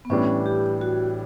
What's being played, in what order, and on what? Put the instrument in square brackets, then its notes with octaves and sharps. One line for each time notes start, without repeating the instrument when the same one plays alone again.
[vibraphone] B3
[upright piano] A2 E3 G3 D4 [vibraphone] C#4
[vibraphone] G4
F#4